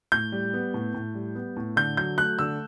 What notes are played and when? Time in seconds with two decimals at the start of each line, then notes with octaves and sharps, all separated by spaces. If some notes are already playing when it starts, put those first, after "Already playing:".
0.12 A2 G6
0.32 G3
0.54 B3
0.74 A2
0.94 A2
1.15 G3
1.35 B3
1.56 A2
1.76 D3 G6
1.97 F#3 G6
2.18 A3 F#6
2.39 D3 E6